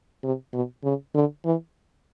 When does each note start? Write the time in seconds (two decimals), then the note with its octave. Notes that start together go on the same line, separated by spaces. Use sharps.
0.24 C3
0.53 B2
0.84 C#3
1.15 D3
1.45 E3